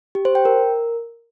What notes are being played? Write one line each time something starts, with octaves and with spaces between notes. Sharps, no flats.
G4
C5
G5
A#4